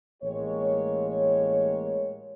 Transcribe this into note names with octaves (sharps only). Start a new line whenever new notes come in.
A1 G#3 A#3 G4 C#5